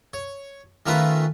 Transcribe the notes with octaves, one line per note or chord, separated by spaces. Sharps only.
C#5
D#3 A3 C#4 F4 A#4 B4